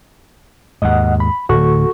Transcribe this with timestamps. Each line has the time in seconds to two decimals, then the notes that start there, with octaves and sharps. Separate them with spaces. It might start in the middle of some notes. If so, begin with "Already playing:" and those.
0.82 D#2 G#2 D#5 F#5
1.20 B5
1.49 D1 F#4 A4 C#6